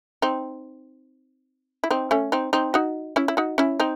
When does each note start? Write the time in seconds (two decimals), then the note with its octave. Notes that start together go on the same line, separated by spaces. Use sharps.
0.22 C4 D#4
1.84 E4
1.90 C4 D#4
2.11 A3 C#4
2.32 C4 D#4
2.53 C4 D#4
2.74 D#4 F#4
3.16 C#4 E4
3.28 E4
3.37 D#4 F#4
3.58 C#4 E4
3.80 C4 D#4